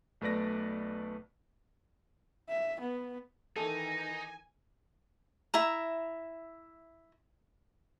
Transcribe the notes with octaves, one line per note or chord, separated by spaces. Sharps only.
B1 A3 B4 D5 A#6
E5
B3
D#3 E3 D#4 A4 G#5
E4 E5 A#5